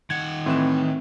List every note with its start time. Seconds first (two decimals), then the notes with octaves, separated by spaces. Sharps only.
0.10 D#3 F#5 G#6
0.46 A2 E3 C4 E7